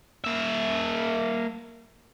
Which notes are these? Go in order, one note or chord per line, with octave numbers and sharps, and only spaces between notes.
A#3 E5